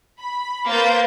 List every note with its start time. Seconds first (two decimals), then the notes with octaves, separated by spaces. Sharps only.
0.18 B5
0.67 A#3 B4 C5 G6 A6